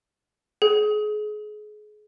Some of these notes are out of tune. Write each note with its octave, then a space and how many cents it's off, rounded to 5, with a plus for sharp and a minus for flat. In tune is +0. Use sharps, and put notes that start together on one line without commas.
G#4 +30